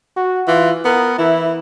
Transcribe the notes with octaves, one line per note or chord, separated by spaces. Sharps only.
F#4
E3 F4
B3 A#4
E3 E4